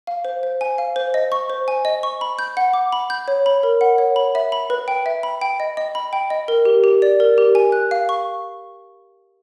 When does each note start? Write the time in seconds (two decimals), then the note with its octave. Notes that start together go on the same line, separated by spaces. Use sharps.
0.07 F5
0.25 C5
0.43 C5
0.61 G#5
0.78 F5
0.96 C5
1.14 D#5
1.32 C#6
1.50 C5
1.68 G#5
1.85 D#5
2.03 C#6
2.21 B5
2.39 G6
2.57 F#5
2.73 D6
2.92 B5
3.10 G6
3.28 C#5
3.46 B5
3.63 A#4
3.81 F#5
3.98 C#5
4.16 B5
4.35 E5
4.52 B5
4.70 B4
4.88 G5
5.06 E5
5.23 B5
5.41 G5
5.60 D#5
5.77 D#5
5.95 B5
6.13 G5
6.30 D#5
6.48 A#4
6.65 G4
6.84 G4
7.02 D5
7.20 A#4
7.38 G4
7.55 G#5
7.72 F#6
7.91 F5
8.09 C#6